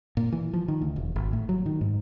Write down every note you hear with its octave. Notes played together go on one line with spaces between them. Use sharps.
A#2
E3
F3
D#3
D2
E1
G#1
A2
F#3
D#3
G#2